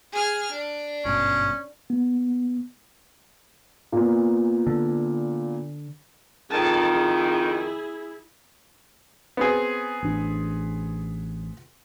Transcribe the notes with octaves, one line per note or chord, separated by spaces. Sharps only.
G#4 F6
D4
G#1 G2 B2 C#4
B3
A#2 B3
D3
F2 D#3 G#4 A5
E4 G#4
B3 C4 G#4
A1 D4